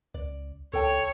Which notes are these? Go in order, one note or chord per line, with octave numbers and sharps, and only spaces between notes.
C#2 D5
C#2 A4 C#5 G5 A5